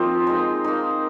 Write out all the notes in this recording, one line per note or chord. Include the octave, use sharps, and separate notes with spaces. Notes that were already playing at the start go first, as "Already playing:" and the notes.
Already playing: F3 A#3 C4 D#4 F4 C5 D#5
G#3 D#4
A#3 D#4